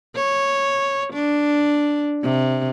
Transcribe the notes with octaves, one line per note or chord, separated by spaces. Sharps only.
C#5
D4
C3